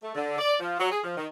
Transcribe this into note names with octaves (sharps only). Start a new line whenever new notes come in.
A3
D3
D5
F3
F#3
G#4
F3
D#3